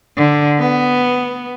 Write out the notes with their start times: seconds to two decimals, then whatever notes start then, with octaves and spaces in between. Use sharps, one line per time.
0.17 D3
0.59 B3